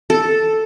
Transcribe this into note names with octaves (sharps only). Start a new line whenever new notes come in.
A4